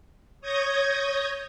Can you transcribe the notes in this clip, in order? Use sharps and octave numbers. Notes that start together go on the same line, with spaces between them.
C#5 D#6 G6 G#6 A#6